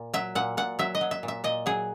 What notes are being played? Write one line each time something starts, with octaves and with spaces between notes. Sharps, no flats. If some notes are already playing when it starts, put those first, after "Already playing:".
Already playing: A#2
F#3 E5
A#2 F#5
A#2 F#5
F#3 E5
D#5
F#3
E5
A#2
E5
A#2 D#5
F#3 G#4